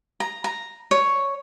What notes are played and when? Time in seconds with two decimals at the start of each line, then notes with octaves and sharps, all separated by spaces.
0.20 A#5
0.44 A#5
0.91 C#5